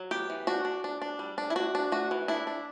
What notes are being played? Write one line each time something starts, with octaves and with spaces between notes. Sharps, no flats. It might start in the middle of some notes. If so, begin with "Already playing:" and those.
Already playing: F#3
B3 G4
E3
D4 F#4
D4
D4
D4
G3
D4
E4
D4 F#4
D4
A3 F#4
E3
D4 E4
D4